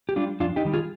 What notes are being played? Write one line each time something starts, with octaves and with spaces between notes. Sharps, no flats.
G4
G3 D4 F4
F2 D4 F4
D#4 G4
D#3 G3
F4 G#4